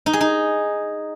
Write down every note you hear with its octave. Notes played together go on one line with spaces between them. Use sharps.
D#4
G#4
D#4